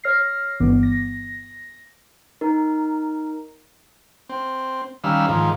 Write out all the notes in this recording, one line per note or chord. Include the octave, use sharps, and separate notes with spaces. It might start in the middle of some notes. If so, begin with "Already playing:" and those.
C#5 F6 A#6 C7
G1 G2 E3 B3 D6
A#6
D#4 A#4
C4
D#3 G3 C#4 F5 B5 E6
G#2 D#3 F3